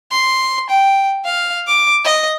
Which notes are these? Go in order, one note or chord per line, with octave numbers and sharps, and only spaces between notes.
C6
G5
F5
D6
D#5